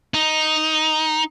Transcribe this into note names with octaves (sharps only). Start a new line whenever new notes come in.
D#4